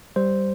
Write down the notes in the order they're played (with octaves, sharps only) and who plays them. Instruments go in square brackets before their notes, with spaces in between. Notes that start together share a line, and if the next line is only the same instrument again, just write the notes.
[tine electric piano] G3 C5